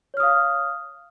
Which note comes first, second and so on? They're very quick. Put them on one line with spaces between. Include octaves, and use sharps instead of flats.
C#5 F6 D#6 F5